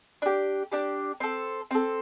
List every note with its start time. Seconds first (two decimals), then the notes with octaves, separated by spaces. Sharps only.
0.22 D4 G4
0.72 D4 G4
1.20 C4 A4
1.71 C4 A4